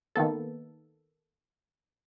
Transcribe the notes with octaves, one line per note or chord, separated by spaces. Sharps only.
D#3 A#3 B3 A4